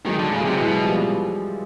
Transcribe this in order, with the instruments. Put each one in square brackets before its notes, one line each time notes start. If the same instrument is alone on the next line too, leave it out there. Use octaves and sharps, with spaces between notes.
[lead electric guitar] D#3 [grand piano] F#3 G#3
[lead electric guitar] D3
C#3
[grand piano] F#3 G#3
[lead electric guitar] C3
[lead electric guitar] B2 [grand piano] E3 F#3
[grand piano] F3 G3